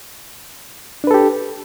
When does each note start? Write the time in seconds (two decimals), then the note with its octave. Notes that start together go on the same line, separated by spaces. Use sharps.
1.04 D4
1.07 B4
1.11 A4
1.14 G4